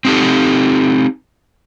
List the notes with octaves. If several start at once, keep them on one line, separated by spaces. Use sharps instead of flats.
C4 D#4 G4 A4